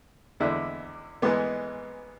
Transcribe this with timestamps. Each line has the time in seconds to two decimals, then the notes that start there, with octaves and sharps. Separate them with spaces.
0.40 E2 D3 G#3 E4
1.22 G#2 E3 G#3 B3